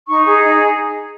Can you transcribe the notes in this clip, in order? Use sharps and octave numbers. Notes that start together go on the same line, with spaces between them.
D#4 C#6
G#4
D#4